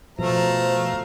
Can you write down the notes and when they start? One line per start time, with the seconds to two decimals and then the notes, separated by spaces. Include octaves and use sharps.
0.19 B2 F3 A3 C5 F5 A#5